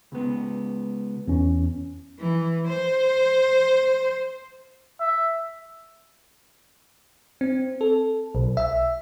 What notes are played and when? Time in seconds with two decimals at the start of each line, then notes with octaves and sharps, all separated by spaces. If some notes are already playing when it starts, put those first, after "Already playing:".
0.12 C#2 B3
1.28 E2 C#4
2.19 E3
2.68 C5
5.00 E5
7.41 C4
7.81 A4
8.35 B1
8.57 E5